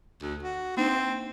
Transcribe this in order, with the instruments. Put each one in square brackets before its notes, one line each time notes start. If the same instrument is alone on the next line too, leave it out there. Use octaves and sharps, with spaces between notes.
[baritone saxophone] D2
F#4
[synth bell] A#3 D4 D#4 [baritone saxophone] C4